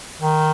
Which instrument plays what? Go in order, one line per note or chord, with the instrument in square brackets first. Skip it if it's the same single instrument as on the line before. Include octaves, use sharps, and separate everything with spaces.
[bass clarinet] D#3